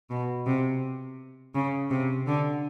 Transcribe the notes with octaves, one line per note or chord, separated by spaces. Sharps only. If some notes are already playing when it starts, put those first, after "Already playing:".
B2
C3
C#3
C3
D3